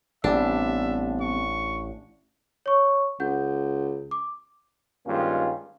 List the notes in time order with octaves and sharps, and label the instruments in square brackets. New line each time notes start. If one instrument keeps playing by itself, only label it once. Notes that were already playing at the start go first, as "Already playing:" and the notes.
[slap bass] A1 [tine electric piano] G3 B3 C4 [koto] D4 [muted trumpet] E5
[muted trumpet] C#6
[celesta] C#5 C#6
[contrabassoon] C#2 [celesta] F#5 G6
[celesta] D6
[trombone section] G2 D#3 G#3 A#3 C#4 F4